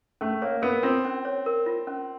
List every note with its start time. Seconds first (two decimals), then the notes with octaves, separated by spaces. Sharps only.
0.21 A3 C#4
0.42 A#3 C#5
0.62 B3 A#4
0.83 C4 F4
1.05 C#4
1.25 C#5
1.46 A#4
1.66 F4
1.87 C#4